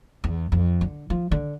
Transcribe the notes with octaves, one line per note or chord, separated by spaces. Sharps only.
E2
F2
D3
F3
D3